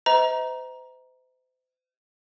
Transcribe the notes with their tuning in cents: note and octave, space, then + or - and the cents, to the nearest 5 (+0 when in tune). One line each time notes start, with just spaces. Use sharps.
C5 -40 D#5 +40 A#5 +15